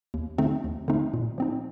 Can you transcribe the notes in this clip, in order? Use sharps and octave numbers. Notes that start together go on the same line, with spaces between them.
D#2
D3 A3 C4 D#4
D#2
D3 A3 C4 D#4
A#2
F3 C4 D#4